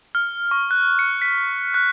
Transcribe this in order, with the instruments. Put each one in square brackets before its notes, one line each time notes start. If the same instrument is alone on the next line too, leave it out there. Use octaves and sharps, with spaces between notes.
[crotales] F6
C#6
F#6
C#7
B6
F#6